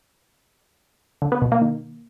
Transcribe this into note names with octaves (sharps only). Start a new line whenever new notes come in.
D3
B3
B2
A#3
D#3